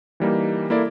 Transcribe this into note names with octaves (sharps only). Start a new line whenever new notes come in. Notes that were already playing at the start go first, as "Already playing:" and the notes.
E3 G3 A#3 D#4
A#3 E4 A4 D5